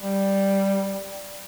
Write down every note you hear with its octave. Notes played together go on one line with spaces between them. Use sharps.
G3